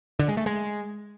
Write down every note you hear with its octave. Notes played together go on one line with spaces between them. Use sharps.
D3
G#3
A3
G#3